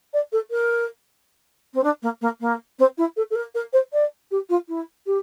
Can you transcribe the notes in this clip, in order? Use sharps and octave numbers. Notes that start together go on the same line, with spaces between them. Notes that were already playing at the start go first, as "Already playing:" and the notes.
D5
A4
A#4
C4
D4
A#3
A#3
A#3
C4
E4
A4
A4
A#4
A#4
C5
D5
G4
F4
E4
G4